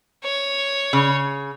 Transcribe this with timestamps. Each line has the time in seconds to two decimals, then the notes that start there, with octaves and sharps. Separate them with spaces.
0.24 C#5
0.93 C#3